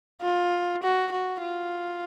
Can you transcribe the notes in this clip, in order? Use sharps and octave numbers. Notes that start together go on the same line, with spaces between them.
F4
F#4
F#4
F4